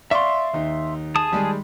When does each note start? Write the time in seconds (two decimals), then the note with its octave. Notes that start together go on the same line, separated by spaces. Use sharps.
0.11 D5 E5 F5 C6 C#6
0.53 D#2 D#4
1.15 G#4 A5 D#6
1.31 D#3 G3 G#3